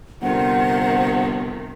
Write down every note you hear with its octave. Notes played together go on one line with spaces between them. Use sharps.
G1 C3 D#3 F3 F4 C5 F#5